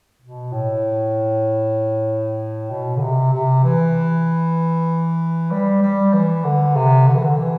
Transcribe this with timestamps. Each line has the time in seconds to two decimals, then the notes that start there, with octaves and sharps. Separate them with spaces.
0.21 B2
0.52 A2
2.71 B2
2.96 D3
3.02 C3
3.33 C3
3.64 E3
5.51 G3
5.82 G3
6.13 E3
6.45 D3
6.76 C3
7.07 D3
7.15 E3
7.23 D3
7.38 E3